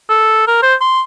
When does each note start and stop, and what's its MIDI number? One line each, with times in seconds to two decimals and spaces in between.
0.10 0.45 69
0.47 0.59 70
0.62 0.75 72
0.81 1.01 84